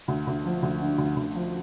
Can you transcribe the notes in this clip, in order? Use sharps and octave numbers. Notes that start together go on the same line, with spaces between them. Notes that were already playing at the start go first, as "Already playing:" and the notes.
D2
D2
F3
D2
D3
D2
D2
F3